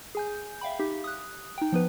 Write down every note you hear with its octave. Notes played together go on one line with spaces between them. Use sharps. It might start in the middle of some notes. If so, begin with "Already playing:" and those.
G#4 G#5 G6
E5 F5 G5 B5
D#4 G4
D#6 F#6
D#4 G5
F3 B3 B4